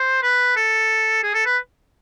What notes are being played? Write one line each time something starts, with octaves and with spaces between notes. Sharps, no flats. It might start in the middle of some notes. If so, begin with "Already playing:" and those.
Already playing: C5
B4
A4
G#4
A4
B4